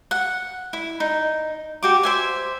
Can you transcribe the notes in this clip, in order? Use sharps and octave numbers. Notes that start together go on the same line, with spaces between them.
F#5
E4
D#4
F#4 G4 D6
C5 E5 G#5